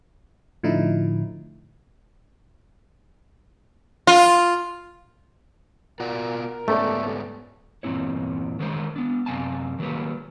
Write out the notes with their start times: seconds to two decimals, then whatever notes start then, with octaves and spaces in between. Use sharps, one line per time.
0.63 A2 D3 F3 D#4 E4
4.07 F4
6.00 B2 F4 F#4 A#4 D5
6.68 G#2 G3 A3 B3 C#4 A4 D5
7.83 E2 G2 A#2 C4 E4 C#5
8.59 D#3 G#3 A3 C#4 C5
8.96 B3 D4
9.26 F#2 C3 B3 F5 G#5 A5
9.79 D#3 F#3 G3 A#3 G#4 B4